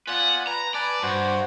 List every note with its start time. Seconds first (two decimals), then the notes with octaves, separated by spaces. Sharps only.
0.07 F4 B4 D5 F#5 G#5
0.47 B4 A#5
0.74 B4 D5 G#5 A5
1.03 G2 F#4 C5